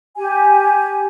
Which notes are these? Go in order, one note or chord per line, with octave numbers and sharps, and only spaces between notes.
G4 G#5